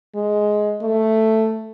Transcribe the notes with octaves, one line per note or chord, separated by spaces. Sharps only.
G#3
A3